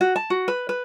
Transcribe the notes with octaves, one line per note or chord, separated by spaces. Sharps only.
F#4
A5
F#4
B4
B4